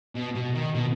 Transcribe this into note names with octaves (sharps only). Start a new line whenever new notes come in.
B2
B2
D#3
B2